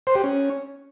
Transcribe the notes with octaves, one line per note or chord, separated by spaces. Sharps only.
C5
G4
C#4